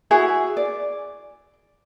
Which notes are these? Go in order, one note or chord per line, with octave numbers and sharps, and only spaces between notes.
E4 F#4 G#4 E5
D5